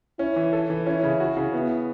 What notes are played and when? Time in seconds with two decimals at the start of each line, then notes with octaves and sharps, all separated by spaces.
0.19 C#4 E4
0.36 E3
0.53 A4
0.70 E3
0.86 C#4 E4
1.03 C#3
1.20 F#4
1.37 C#3
1.53 B3 E4